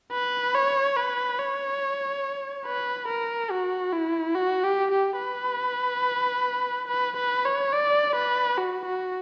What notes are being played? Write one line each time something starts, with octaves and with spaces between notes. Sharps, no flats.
B4
C#5
B4
C#5
B4
A#4
F#4
E4
F#4
G4
G4
B4
B4
B4
C#5
D5
B4
F#4
F#4